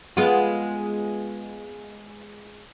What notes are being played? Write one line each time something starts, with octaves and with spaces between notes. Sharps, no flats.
G#3 B3 F4